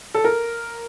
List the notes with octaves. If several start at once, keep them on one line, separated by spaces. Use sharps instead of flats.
A4
A#4